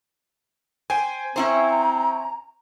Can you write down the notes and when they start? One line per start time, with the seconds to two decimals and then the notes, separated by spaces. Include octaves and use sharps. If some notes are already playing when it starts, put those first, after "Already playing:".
0.90 C5 G5 G#5
1.36 C4 C#4 E4 C5 A#5